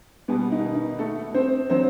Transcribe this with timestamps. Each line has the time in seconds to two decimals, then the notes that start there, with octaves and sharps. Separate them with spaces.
0.28 B2 G3 B3
0.52 D#3 D#4
0.75 D#3 D#4
0.99 A3 A4
1.35 C4 C5
1.70 D3 F#3 C4 C5